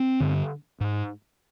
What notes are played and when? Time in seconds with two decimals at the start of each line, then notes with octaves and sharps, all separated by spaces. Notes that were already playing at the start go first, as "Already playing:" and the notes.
Already playing: C4
0.20 G2 D3
0.80 G#2